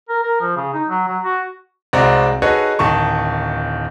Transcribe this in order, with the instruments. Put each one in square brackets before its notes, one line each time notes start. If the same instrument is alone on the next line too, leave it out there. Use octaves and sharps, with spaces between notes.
[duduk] A#4
A#4
F3
C#3
D#4
F#3
F#3
F#4
[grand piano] C2 G#3 C4 F#4 D5 A#5
D#4 F#4 G#4 A4 B4 C#5
D1 D#3 A5 C#6